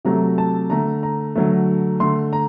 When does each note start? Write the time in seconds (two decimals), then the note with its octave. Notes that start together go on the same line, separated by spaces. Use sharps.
0.05 C3 F#3 A3 A#5
0.38 A5
0.70 D3 A3 A#5
1.03 A#5
1.35 D3 F#3 A3
2.00 D3 A3 C6
2.33 A#5